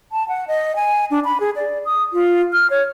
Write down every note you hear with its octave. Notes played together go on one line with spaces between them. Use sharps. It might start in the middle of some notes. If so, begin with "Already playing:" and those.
A5
F#5
D#5
G#5
D4
B5
G#4
D5
D#6
F4
F6
C#5